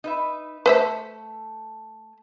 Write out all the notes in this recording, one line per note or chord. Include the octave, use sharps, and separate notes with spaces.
D#4 B4 E5
A3 B4 C5 E5